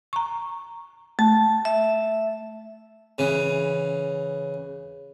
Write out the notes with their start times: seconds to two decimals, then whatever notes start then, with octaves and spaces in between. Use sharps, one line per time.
0.13 A#5 C#6
1.19 A3 A5
1.65 E5
3.18 C#3 E3